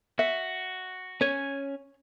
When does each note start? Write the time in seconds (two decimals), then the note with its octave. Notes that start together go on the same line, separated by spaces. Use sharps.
0.19 F#4 E5
1.21 C#4 C#5 G#5